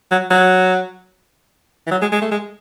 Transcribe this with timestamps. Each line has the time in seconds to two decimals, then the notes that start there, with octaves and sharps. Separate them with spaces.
0.11 F#3
0.31 F#3
1.87 E3
1.92 F#3
2.02 G#3
2.12 G#3
2.22 A3
2.32 G#3